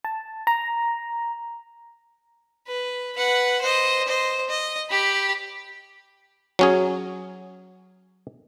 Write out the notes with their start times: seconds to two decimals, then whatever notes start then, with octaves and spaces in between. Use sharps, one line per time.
0.05 A5
0.47 A#5
2.68 B4
3.17 B4 F#5
3.61 C5 D#5
4.08 C5 D#5
4.49 D#5
4.90 G4 B5
6.59 F#3 C#4 G#4